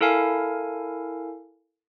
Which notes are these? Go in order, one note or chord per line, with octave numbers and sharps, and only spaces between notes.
E4 A4 A#4 F5 G#5